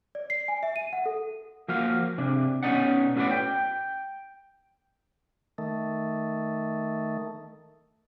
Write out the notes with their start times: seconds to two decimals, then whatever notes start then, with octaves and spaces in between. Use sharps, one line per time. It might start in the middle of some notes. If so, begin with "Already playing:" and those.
0.15 D5
0.30 C7
0.48 G#5
0.63 E5
0.76 D#7
0.93 F#5
1.06 A4
1.68 F3 A#3 F#4 F5
2.18 C3 D4
2.63 B2 E3 C#4 D#4 D5 F#5
3.16 A2 C#4 F#4 A4 B4 D5
3.31 G5
5.58 D#3 A3